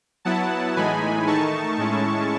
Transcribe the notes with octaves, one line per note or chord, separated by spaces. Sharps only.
F#3 B3 E4 F#5 A5
A2 E3 G#3 D#4 G#5 B5
D#3 A3 D#4 A5 C#6
A2 G#3 C#4 E4